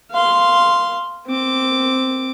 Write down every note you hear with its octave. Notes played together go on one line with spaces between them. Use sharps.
F5 C6
C4 D6